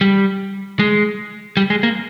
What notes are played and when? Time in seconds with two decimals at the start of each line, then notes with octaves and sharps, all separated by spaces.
0.01 G3
0.79 G#3
1.57 G3
1.70 G#3
1.83 A#3